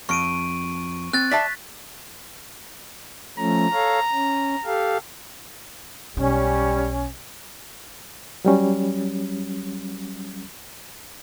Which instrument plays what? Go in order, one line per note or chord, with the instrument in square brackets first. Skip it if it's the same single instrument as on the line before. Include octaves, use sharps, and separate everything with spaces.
[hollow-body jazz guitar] F2 [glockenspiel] C#6 D7 D#7
[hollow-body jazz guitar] C4 [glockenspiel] F#6 A6
[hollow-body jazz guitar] D5 E5 A5 [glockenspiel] B6
[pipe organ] F3 A3 C#4 [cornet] A#5
[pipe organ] A4 C#5 F5
C#4
G4 A4 F5
[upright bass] B1 D#4 [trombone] G3 [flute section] C#4
[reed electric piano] F#3 G3 C#4